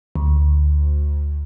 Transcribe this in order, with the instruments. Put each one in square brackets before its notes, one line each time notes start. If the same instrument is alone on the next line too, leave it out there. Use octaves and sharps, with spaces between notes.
[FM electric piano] D2